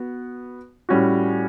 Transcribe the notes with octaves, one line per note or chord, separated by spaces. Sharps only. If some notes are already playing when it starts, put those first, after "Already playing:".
Already playing: B3 F#4
A2 G3 C#4 F#4